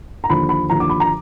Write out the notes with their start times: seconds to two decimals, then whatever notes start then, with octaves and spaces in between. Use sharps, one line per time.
0.24 A#5
0.30 D#2 D3 F3 B5
0.49 B5
0.70 D#2 D3 F3 A#5
0.80 D6
0.89 B5
1.00 A#5